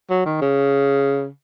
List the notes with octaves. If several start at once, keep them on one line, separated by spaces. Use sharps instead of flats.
F#3
D#3
C#3